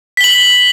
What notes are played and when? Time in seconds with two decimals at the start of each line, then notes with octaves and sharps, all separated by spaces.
0.17 B6
0.21 G7
0.24 F#7